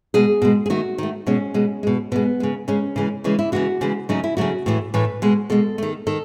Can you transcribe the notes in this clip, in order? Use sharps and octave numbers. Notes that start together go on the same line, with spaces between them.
B2 G#3 G#4
B2 G#3
G#4
D#3 A3 F#4
D#3 A3
B2 G#3 C#4
B2 G#3
B2 G#3
B2 G#3 B3
C#3 G#3
C#3 G#3 C#4
C#3 E3 G#3
C#3 E3 G#3 C#4
E4
C#3 E3 G#3 F#4
C#3 E3 G#3
C#3 F#3 A3 D#4
E4
C#3 F#3 A3 F#4
A2 E3 A3
A2 E3 A3 B4
B2 G#3
B2 G#3 A4
D#3 A3
D#3 A4